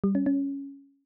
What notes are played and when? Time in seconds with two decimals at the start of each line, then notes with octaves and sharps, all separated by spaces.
0.04 G3
0.15 C#4
0.26 C#4